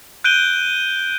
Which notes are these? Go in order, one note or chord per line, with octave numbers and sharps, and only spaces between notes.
F#6 G6 D7 D#7 G7